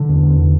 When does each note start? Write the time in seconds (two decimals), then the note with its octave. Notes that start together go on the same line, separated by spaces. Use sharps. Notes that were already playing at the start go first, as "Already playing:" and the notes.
Already playing: D3
0.09 E2
0.22 E2
0.38 D3